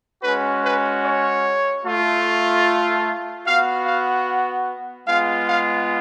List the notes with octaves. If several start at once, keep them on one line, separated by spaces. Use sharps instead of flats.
G#3 C#4 F#4 B4
B4
C#5
A3 F4
B3 F#4 F5
F5
G#3 B3 F4 F5
F5